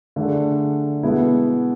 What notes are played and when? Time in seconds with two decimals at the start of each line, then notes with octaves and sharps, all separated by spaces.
0.16 D3 A3 D4 G#4
1.03 B2 G#3 B3 E4